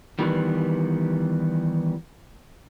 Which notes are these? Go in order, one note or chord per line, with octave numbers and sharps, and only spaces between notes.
D#3 E3 G3 B3